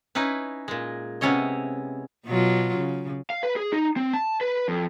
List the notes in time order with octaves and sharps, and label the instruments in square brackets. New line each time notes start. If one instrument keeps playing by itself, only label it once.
[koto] C#4 D#4 E4 B4
A#2 G#3
C3 B3 C#4 E4 C#5 D#5
[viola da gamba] B2 F#3 F4
C#3
[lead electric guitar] F5
B4
G#4
D#4
C4
A5
B4
F2